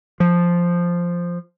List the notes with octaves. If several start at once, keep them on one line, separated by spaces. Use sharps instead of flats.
F3